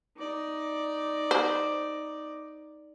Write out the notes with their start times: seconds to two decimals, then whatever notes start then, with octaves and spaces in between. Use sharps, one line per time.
0.17 D#4 D5
1.31 C5